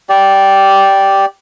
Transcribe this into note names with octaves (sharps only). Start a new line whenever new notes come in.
G4 D5